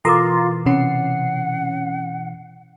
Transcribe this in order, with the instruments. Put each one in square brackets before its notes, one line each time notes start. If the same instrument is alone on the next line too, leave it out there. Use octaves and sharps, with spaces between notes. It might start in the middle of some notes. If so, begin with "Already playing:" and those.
[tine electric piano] B2 E3 [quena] F4 [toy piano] A4 A#4 D6 [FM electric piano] A#5 C6
[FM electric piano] C3 C#4 C7 [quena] F#5